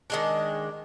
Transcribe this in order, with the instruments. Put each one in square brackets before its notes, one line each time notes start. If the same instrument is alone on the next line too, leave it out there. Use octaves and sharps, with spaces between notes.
[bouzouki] D#3 G#3 D4